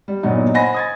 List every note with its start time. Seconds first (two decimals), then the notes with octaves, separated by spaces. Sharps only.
0.08 G3
0.23 G1 A#2 F#3 B3 D#4
0.54 C5 D#5 F#5 G#5 B5 A#6
0.74 D#6 G#6 A6